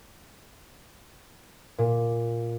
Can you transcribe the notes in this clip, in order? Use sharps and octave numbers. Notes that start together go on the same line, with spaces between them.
A#2